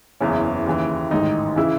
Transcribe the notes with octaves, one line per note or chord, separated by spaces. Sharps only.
F#1 E2 C#3 E3 C#4
D#2 C#3 E3
A1 G#2 D#3 D#4
C#3 E3 E4